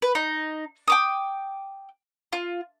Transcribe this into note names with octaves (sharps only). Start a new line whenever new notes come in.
B4
D#4
G5 D6 D#6
F4